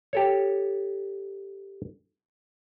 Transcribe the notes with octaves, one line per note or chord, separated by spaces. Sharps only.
G4 A4 C#5